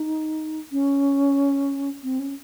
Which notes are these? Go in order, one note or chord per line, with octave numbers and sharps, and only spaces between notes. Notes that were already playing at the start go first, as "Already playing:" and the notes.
Already playing: D#4
C#4
C4
C#4